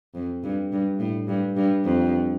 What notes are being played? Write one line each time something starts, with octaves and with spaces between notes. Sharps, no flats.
F2
G2
G2
A2
G2
G2
F2